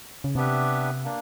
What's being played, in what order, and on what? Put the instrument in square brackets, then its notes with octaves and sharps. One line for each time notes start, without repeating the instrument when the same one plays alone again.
[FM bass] C#3
[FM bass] C3 [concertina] B3 D4 G4 B4 E5
[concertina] A#3 D4